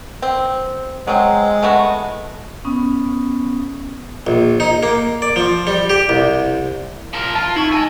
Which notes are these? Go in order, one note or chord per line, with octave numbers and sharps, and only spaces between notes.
C4
F#3 G#3 C4
A3 B3 F#4
B3 C#4 D#6
A#1
D#4
A#3
D5
F3
G3
G4
C2
F3 A#4
F4 A5
D#4 E4 C#6
D#5 G#5 A5 E6